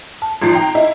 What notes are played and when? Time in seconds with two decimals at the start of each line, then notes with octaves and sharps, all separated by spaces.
0.22 A5
0.42 G#1 F3 C7
0.53 G5 A#5
0.75 E4 D#5